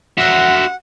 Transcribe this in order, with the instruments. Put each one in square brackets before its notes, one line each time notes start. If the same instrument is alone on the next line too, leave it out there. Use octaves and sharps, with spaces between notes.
[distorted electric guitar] F#4 E5 [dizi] F#5